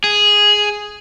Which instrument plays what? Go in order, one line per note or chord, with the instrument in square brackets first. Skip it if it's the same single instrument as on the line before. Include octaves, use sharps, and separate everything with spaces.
[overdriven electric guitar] G#4